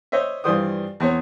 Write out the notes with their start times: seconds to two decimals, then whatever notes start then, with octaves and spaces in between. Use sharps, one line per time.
0.12 C5 C#5 D#5 E5
0.44 G2 E3 F4 C5 D5 D#6
1.00 E2 C4 C#5